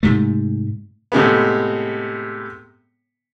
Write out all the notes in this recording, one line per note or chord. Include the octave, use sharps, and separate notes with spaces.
G#2 C3 A3
A2 C3 G#3 B3